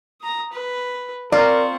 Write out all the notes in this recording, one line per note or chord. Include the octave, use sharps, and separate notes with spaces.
A#5 D#6
B4
C4 F4 A#4 D5 C#6